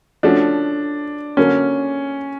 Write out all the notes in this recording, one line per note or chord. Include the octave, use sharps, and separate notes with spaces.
F3 A3 C#4 D4 F#4
D3 F#3 A#3 C#4